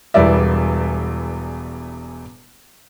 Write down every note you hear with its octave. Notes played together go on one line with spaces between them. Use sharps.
E1 E2 G3 B3 D5 E5